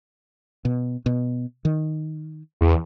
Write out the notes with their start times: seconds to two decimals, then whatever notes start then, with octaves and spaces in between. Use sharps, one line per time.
0.65 B2
1.06 B2
1.65 D#3
2.61 E2